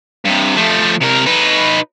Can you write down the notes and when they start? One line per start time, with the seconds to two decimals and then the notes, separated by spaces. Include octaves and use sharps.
0.25 G2 C3
0.56 F3 A3
1.01 C3 A#4
1.26 D#4 B4